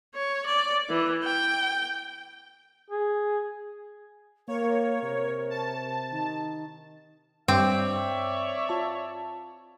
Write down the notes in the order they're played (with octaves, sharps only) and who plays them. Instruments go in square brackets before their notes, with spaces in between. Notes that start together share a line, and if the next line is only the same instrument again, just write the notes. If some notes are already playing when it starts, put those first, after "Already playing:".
[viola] C#5
D5
E3
G5
[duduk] G#4
[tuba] A#3 [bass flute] A#4 [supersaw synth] C#5
[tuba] C3
[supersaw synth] A5
[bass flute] D#3
[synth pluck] G2 [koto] C4 [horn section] C#5 D5 E5 [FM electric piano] G5 D6
[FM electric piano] F4 A5